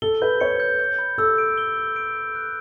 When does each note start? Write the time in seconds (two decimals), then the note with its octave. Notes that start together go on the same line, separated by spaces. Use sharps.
0.02 A4 G7
0.22 B4 G6
0.41 C#5 C#7
0.60 G6
0.80 G6
0.99 B5
1.18 A4 E6
1.38 D7
1.58 G7
1.77 G6
1.96 D7
2.15 G6
2.35 F#6